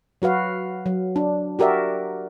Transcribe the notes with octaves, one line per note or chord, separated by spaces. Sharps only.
F#3 F#4 B4 F5
F#3
D4
F#4 G4 A#4 D5 E5